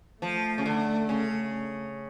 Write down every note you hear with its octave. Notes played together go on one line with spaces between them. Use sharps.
F3 A3
C#3
D3
C#3